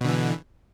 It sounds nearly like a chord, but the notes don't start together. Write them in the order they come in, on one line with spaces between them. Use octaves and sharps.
B2 D3 E3